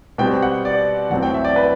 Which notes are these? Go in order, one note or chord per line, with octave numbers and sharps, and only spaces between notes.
B2 G3 C4 G5
F#5
D5
E2 B2 F#3 A3 C4 F#5
G5
E5
D5
B4